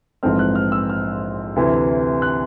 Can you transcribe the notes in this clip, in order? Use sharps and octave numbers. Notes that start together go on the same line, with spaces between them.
A#1 G#2 E3 A3 C4 F6
F#6
F6
E6
F6
D2 C3 E3
F#6